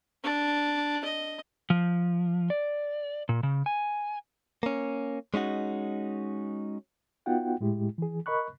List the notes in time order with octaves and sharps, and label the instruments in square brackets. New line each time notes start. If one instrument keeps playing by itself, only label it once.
[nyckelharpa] D4
D#5
[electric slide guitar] F3
D5
A#2
C#3
G#5
[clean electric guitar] A#3 C#4
G#3 C#4 D#4 F#4
[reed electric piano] B3 D#4 F4 F#4 F#5 G5
A2 G#3 E4 G4
E3 G#4
A#4 D#5 B5 C#6 F#6